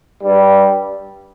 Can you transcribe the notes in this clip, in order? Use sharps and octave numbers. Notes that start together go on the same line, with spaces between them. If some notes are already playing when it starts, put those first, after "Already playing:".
G2 G3